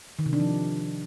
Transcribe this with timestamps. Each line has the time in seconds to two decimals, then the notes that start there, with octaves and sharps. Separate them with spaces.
0.19 D#3
0.26 C3
0.33 D4
0.40 F3